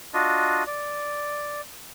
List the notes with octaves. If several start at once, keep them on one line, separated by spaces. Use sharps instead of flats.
D4 F4 F#4 D#5
D5